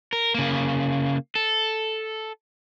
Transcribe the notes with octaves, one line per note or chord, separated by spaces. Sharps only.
A#4
C#3 A#3
A4